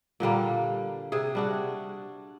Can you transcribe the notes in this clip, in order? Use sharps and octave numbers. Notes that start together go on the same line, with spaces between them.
A#2 D3 G3 A#3
C3 G#4
G3 D4 F#4